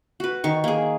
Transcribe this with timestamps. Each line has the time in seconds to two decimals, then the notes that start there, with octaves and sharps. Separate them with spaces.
0.20 F#4 B4
0.44 D#3 C#6
0.64 A#3 G#4